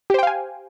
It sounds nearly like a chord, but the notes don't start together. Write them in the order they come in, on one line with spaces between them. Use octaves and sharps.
G4 C5 G5 F5 G#5